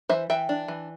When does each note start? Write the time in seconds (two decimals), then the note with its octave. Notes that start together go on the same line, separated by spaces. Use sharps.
0.09 E3 C5 E5
0.30 E3 E5 G5
0.49 D4
0.68 E3